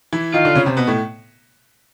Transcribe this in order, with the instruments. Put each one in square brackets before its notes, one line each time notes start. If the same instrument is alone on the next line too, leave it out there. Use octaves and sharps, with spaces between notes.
[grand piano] E3 E4
[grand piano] D#3 D#4 [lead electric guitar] F4
[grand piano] D3 D4
C#3 C#4
C3 C4
B2 B3
A2 A3